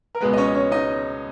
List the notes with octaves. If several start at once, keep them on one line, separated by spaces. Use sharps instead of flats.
A#4
C#2 B2 G#3 B3 B4
D#5
C#4 C#5
C#4 C#5
D#4 D#5